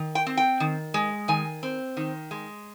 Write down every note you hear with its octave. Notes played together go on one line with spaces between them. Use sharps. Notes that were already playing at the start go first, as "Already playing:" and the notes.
Already playing: D#3
G5
C4
G5
D#3
G#3
D#3 G#5
C4
D#3
G#3